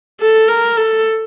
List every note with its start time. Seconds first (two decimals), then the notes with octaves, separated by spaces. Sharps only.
0.21 A4
0.48 A#4
0.77 A4